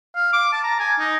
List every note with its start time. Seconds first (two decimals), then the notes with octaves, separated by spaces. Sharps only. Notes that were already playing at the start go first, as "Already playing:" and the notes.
0.15 F5
0.33 D6
0.52 A5
0.64 A#5
0.80 G#5
0.99 D#4